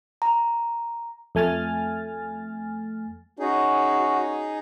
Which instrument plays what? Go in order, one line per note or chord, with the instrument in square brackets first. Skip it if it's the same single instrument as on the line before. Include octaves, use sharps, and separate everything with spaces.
[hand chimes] A#5
[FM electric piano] F2 A3 G#5 F6 A6
[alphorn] C#4 [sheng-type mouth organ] D#4 G#4 [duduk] F#4